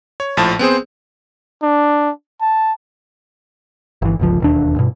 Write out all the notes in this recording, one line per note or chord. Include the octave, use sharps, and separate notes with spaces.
C#5
A#1 A2 F3 A5
B3 C4 G#4 C5
D4
A5
G1 E3
G1 C#2 F3
E1 D#2 D4
G2 B2